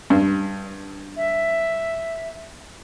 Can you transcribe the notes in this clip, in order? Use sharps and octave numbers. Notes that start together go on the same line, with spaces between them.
G2
E5